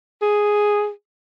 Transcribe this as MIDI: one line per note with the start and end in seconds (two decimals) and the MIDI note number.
0.22 0.90 68